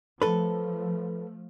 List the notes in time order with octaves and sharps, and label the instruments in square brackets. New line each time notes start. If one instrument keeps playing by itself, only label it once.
[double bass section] F3 A3 [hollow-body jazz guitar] A4 B4